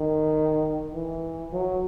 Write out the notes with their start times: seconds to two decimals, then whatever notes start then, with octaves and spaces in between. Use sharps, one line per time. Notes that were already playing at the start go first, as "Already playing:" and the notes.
Already playing: D#3
0.94 E3
1.53 F#3